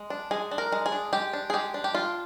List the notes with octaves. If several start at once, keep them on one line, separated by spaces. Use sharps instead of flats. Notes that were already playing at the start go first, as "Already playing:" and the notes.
Already playing: G#3
D4
G#3 G#4
D4
A#4
G#3
G#4
D4
G#3 G4
D4
G#4
G#3 G4
D4
G4
D4 F4